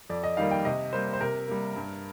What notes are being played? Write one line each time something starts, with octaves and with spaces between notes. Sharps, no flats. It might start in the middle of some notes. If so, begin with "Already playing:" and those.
F2 D5
D#5
D#3 G3 A#3 F5
G5
C3 D#5
G3 A#3 C5
C5
C3 A#4
G3 A#3
G2